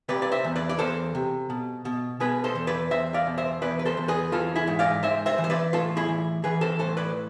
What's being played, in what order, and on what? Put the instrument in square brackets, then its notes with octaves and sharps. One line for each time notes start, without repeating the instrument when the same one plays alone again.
[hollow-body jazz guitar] C3 B4 D5
D5
C5 E5
E2
B4 D5
D5
E2 A4 C5
C3
B2
B2
B2 G#4 B4
A4 C5
E2
B4 D5
E2 C5 E5
D5 F5
B2
C5 E5
E2 B4 D5
B4
A4 C5
E2
G#4 B4
E3 F4 A4
E4 G#4
G#2
D5 F5
G#2 C5 E5
C5 E5
E3
C5
B4 D5
A2 F4 A4
E4 G#4
E3
E3 G#4 B4
A4 C5
A2 A4 C5
B4 D5